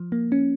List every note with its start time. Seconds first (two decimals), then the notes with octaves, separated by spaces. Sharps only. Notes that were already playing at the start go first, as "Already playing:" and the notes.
Already playing: F3
0.12 A#3
0.32 C#4